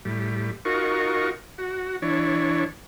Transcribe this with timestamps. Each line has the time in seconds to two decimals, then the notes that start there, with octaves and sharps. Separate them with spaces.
0.05 A2 G3
0.65 D#4 F4 F#4 A#4 C#6
1.58 F#4
2.02 E3 D4 C#5